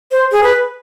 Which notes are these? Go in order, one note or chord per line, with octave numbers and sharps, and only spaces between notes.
C5
G#4
B4